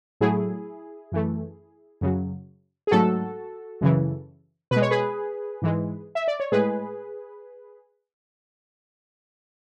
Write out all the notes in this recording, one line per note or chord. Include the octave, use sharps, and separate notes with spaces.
A2 F#3 A3 E4 G#4
F#2 E3 A3
F#2 C#3 F#3
G#4
G#2 F#3 A3 F#4 A4
F#2 C#3 E3
B2 B4
G#3
C#5
G#4 B4
G#2 E3 G#3
E5
D5
C#5
A2 G#3 G#4 B4